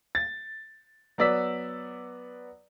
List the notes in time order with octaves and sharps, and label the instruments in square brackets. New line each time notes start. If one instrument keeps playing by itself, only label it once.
[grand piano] A6
F#3 B3 D5 E6 B6